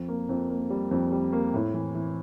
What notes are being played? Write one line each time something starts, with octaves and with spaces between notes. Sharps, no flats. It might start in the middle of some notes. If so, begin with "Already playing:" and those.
Already playing: F2
A#3
F2
A#3
G3
F2
G3
A#3
A2
E3
E3